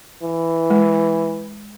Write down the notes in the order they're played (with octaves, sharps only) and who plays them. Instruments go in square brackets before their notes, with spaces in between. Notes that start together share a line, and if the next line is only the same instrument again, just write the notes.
[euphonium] E3
[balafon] G#3